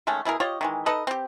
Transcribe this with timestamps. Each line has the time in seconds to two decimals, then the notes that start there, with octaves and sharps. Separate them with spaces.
0.07 D#3 G#3 A3 C#4
0.25 B2 E4 G#4 A#4
0.40 F4 G4 C#5 D#5
0.61 D#3 E3 G#3
0.86 D#4 A4 B4 D#5
1.07 C4 G4